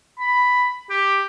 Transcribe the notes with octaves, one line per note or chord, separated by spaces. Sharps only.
B5
G4